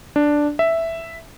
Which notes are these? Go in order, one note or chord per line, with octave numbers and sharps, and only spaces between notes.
D4
E5